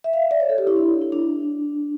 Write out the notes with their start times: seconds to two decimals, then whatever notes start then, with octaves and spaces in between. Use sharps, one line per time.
0.04 E5
0.13 F5
0.22 E5
0.31 D5
0.40 C#5
0.49 A4
0.58 G4
0.67 E4
0.76 D4
1.02 E4
1.12 D4